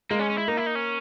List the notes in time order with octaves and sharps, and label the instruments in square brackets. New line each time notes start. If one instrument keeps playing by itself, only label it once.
[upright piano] G#3 [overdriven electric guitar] A#3
[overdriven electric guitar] C#4
C#4
E4
[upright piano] A#3 [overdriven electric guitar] D#4
[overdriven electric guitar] E4
D#4
C#4